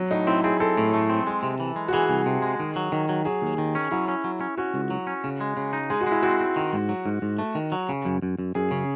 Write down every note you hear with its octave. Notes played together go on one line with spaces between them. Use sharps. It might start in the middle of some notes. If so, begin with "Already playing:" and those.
Already playing: F#3
A2 D#4
C4 E4
C4 G#4
C4 A4
A2
A3
C4
G#3
C3
E3
G#3
F#4
E3 G#4
C2
C3
G#3
D#3
F#3
D#3
F#3
F#3 G#4
D#2
D#3
C#4
F#3 E4
C#4
F#3
C#4
C#4 F#4
C#2
F#3
C#4
C#3
G#3
C#3
D#4
G#3 G#4
F#4
G#3 E4
C4 F#4
C4
D#3
G#2
F#3
G#2
G#2
A3
D#3
F#3
C#3
F#2
F#2
F#2
F#2 G#4
C#3